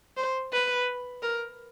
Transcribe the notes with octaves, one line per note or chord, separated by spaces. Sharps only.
C5
B4
A#4